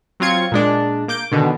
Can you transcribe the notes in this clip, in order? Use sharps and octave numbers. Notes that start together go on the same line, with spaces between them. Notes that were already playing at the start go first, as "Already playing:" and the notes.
F#3 C4 F4 G#6 C#7
A#2 G#3 D4
A#3 D6 G6 D7
B2 D3 D#3